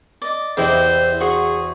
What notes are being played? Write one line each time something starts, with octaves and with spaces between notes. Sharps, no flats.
D5 D#5
E2 C3 E4 G4 C5 D#5
F#4 G#4 C5 C#6